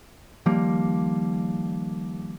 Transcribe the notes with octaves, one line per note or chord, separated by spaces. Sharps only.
D#3 F3 G3 A#3